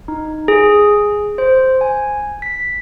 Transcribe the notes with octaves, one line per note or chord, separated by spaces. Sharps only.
D#4
G#4
C5
G#5
B6